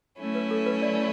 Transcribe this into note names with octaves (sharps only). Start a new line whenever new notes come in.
F#3 A3 C#4 E4
B4
A4
B4
D5